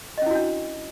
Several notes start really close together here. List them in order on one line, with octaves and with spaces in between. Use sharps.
D#5 C#4 E4 F#4 D4